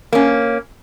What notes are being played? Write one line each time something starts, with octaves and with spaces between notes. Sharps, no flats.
A#3 C#4